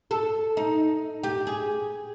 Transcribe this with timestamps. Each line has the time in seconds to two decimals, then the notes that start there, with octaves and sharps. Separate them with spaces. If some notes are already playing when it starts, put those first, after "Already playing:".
0.11 A4
0.57 D#4
1.23 G4
1.47 G#4